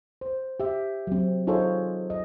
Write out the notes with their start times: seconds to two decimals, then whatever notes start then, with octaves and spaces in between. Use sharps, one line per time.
0.21 C5
0.60 G4 E5
1.07 F#3 C4
1.47 D#4 F4 G#4 A4 C5 C#5
2.10 D#5